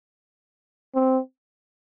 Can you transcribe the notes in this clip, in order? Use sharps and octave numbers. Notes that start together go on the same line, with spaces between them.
C4